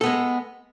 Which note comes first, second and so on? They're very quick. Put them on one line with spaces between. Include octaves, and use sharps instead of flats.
A4 B3 G#3